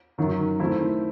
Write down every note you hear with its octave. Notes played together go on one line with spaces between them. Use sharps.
F#2 D#3 F#3
D#3 A3 C4 E4